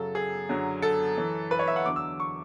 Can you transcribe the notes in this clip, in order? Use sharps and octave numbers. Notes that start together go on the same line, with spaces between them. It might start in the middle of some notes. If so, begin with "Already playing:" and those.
Already playing: F#2 C#3 F#3 A4
G#4
F#2 D3 F#3
A4
F#2 E3
B4
C#5
E5
F#5
E2 D3 F#3 D6
E6
C#6